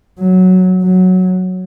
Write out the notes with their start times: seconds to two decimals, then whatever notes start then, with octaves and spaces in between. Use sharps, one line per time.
0.19 F#3
0.82 F#3